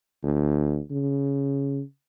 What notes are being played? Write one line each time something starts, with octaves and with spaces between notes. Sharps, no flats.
D2
C#3